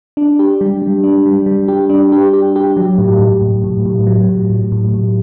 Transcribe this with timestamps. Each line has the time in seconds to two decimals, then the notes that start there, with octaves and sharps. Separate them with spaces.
0.17 D4
0.39 G4
0.61 G3
0.82 G3
1.04 D4
1.26 G3
1.46 G3
1.68 G4
1.90 D4
2.12 G4
2.33 G4
2.56 G4
2.77 F#3
2.98 A2
3.19 A2
3.42 A2
3.64 A2
3.86 A2
4.07 F#3
4.29 A2
4.50 A2
4.72 A2
4.94 A2